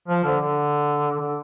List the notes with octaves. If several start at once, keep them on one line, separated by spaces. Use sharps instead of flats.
F3
D3
D3
D3